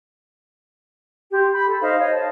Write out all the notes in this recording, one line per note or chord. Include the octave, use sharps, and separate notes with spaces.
G4 C6
B5
A4
D#4 C5 D#5 F5
C#5 D#5
A5